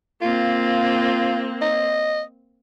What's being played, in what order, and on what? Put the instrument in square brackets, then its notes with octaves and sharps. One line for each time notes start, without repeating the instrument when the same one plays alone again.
[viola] A#3 C4 [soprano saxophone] F4
[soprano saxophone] D#5